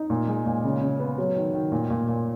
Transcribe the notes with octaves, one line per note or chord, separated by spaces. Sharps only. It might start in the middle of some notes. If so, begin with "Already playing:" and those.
Already playing: D#4
A#2
G#3
A#2
C#3
C#3
B3
F#3
D#3
D#3
A#2
A#2
A#2